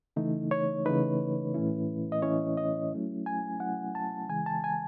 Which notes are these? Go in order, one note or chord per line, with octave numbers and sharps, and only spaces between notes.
C#3 E3 A3 D#4
C#5
C#3 E3 A3 D#4 B4
A2 E3 A3 C#4 E4
D#5
A2 E3 A3 C#4 E4 C#5
D#5
F#3 A3 C#4 E4
G#5
F#3 A3 C#4 E4 F#5
A5
C#3 E3 G#3 G#5
A5
G#5